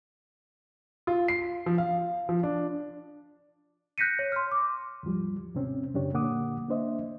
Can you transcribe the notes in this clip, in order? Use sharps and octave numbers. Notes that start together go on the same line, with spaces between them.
F4
C7
F3
F5
F3
D4
F#6 G6 A#6 B6 C#7 D#7
C#5
C6 F6
D6
D#2 G#2 F3 G3
D#2 G#2 C3 C4 C#4
F#2 C#3 D4 G4 C#5
A#2 D3 A#3 F#5 D6 D#6
A#3 D4 C5 D#5 E5